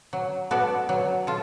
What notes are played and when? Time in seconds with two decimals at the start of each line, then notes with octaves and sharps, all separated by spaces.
0.13 F#3
0.51 B3 F#4 A4 D5
0.89 F#3
1.27 F4 A4